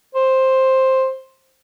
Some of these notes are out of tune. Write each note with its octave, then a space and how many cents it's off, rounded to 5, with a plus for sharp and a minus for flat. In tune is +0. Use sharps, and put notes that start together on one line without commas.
C5 +5